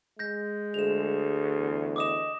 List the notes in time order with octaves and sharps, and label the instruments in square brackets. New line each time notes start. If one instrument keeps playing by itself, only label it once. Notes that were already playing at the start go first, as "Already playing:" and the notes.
[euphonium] G#3 [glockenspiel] G6 A#6
[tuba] D2 [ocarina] G#4 [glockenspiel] E7 F7
[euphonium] E2
[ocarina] D#5 [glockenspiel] D6 D#6 E7